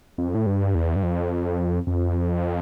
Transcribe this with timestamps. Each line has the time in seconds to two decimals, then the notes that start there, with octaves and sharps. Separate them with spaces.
0.18 F2
0.35 A2
0.46 G2
0.75 E2
0.96 G2
1.03 F2
1.87 F2